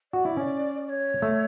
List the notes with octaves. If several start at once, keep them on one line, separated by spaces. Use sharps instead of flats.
F#4 D5
E4
C#4
D5
C#5
A3